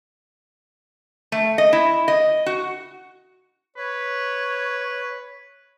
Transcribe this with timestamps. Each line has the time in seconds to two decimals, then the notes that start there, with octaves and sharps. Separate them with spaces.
1.32 A3
1.58 D#5
1.73 E4
2.08 D#5
2.46 F#4
3.77 B4 C#5